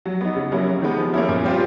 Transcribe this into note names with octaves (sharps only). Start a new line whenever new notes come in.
F#3
B3 D#4
C#3
F#3 A#3 C#4 E4
C3
D#3 G#3 B3
F3
A#3 C#4 E4
A#2
G3 C4 F4